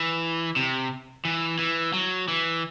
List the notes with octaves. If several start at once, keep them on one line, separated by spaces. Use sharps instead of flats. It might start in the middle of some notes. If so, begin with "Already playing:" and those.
Already playing: E3
C3
E3
E3
F#3
E3